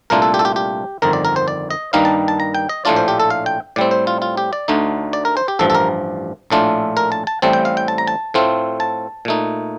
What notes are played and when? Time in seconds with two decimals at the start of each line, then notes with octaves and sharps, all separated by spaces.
0.10 C2 A#2 A3 D4 F4 A#4
0.22 A4
0.34 G4
0.39 A4
0.45 G4
0.56 G4
1.02 G1 F2 D#3 A#4
1.13 D5
1.25 A#4
1.36 C5
1.48 D5
1.71 D#5
1.93 G2 D#3 G3 A#3 D#4 F5
2.05 A5
2.28 A5
2.40 A#5
2.55 G5
2.69 D#5
2.85 A#1 A2 A3 D4 F4 D5
2.96 C5
3.08 G4
3.20 A4
3.30 F5
3.46 G5
3.76 A2 G3 C4 D5
3.91 C5
4.07 F4
4.22 F4
4.37 G4
4.53 D5
4.68 D2 D3 A3 D#4
5.13 D5
5.25 A#4
5.37 C5
5.48 G4
5.59 A1 G2 F3 A4
5.70 A4
5.75 A#4
6.50 A#1 A2 A3 D4 F4
6.97 A#4
7.12 A5
7.27 A5
7.42 A1 A2 G3 C4 A5
7.53 G5
7.65 F5
7.77 G5
7.88 A5
7.98 A#5
8.07 A5
8.34 A2 A3 C4 F4
8.80 A5
9.25 A#2 A3 D#4